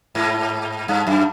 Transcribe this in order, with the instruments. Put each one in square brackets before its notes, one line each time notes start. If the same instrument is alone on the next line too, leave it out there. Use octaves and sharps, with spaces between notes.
[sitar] G#2
G2
F#2